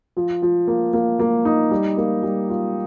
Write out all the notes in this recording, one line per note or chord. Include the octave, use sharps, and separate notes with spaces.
F3
F3
A#3
A#3
A#3
D#4
G3
A#3
G3
F4